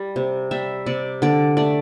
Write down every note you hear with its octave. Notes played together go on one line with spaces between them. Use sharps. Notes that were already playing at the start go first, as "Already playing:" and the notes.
Already playing: G3
C3
G3 E5
C3 D5
D3 D5
A3 D5